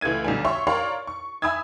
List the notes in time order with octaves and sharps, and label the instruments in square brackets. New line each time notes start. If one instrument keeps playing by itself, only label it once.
[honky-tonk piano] C#2 E3 A3 G#6 D#7
B1 D3 G3 G#5
C#5 E5 C6 C#6
A#4 C#5 D5 F5 C6
C#6
E5 G#5 B5 D#6 E6 G#6